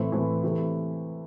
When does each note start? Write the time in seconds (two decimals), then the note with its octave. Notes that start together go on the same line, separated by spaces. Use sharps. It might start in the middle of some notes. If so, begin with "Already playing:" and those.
Already playing: A2 E3 A3 C4 E4
0.12 A2 E3 A3 C4 E4
0.43 C3 E3 A3 E4